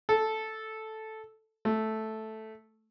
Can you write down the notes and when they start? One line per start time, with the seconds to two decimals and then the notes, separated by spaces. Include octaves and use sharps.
0.09 A4
1.65 A3